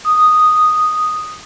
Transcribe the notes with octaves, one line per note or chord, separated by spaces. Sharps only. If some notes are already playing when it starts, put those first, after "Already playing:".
D#6